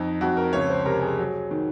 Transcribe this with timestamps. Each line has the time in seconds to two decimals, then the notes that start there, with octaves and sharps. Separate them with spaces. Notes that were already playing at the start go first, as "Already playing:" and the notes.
Already playing: F2 D#4
0.21 F2 F#4
0.37 A#4
0.53 C#2 C#5
0.69 C5
0.86 C3 A#4
1.02 G#4
1.19 F#3
1.51 D#3